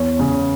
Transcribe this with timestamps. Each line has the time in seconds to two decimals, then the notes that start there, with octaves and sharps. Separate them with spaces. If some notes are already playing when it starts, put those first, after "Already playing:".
Already playing: E2 C#5
0.19 C#3